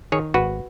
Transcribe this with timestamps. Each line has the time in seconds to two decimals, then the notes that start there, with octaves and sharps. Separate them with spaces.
0.12 D#3 G#4 C#5
0.34 G#1 F#4 B4